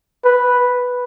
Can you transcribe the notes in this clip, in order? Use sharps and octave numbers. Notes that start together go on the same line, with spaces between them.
B4